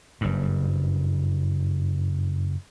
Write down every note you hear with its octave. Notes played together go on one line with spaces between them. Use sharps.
F#1 G2